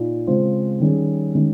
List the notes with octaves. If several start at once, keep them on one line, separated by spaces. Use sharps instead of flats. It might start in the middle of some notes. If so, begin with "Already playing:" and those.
Already playing: A#2 D#4
C#3 G#3 C4 F4 C5
D#3 G3 C#4 G#4
D#3 G#3 C#4